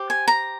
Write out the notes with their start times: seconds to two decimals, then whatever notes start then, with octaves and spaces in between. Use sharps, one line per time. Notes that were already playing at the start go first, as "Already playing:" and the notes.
Already playing: G4 C5
0.10 G#5
0.28 A#5